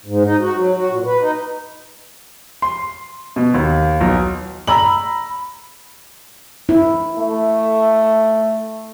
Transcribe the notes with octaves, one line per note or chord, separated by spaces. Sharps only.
G#2
D#4
F#4
F#3
F#4
A#2
B4
D#4
C6
B2
D#2
B1
A#5 B5 E6 F#7
E4
A3